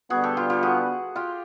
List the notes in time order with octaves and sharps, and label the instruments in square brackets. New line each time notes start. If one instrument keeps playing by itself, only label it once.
[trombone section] D3 G3 B3 [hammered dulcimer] F#4 G#4
[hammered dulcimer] G4 A4
F4 G4
F4 G4
F#4 G#4
F4 G4